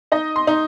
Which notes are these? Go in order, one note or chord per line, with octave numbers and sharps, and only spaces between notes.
D#4 D#5
C6
D#4